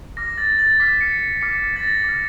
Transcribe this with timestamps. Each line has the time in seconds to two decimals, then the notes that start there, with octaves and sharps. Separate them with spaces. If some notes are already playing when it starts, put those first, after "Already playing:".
0.17 D6 F6 A#6
0.38 A6
0.59 A6
0.80 D6 F6 B6
1.01 C#7
1.41 D6 F6 C#7
1.76 A6
1.83 A#6
2.04 D6 F6